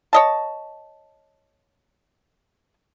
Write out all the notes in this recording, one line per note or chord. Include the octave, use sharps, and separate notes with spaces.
C#5 D#5 A5